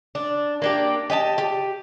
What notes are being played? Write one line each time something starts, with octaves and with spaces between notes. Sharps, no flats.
D4
A#3 D4 G4
G4 D#5 G#5 A5
G4